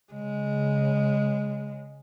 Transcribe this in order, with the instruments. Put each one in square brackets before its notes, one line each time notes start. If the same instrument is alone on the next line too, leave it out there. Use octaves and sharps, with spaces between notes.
[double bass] C#3 [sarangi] G#3